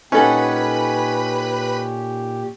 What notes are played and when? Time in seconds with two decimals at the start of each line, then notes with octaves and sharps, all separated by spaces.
0.12 A#2 C#4 D#4 G4 A4 B4 F#5 B5